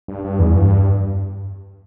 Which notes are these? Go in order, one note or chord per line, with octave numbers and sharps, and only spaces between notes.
G2
G2
E2
G2